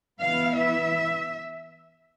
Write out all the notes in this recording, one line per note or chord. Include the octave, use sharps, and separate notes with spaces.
E3 B3 E4 F5
E5